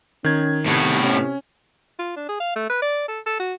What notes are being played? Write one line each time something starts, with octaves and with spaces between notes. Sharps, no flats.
D#3 C#4 G#6
A2 C3 B3
C#4
F4
D4
G#4
F5
A3
B4
D5
A4
A4
F#4